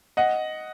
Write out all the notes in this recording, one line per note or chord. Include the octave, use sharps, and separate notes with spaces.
D#5 F#5